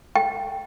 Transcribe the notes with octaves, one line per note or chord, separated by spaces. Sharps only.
G5